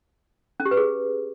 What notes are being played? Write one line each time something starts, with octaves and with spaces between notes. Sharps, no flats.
C#4
G4
B4
G#4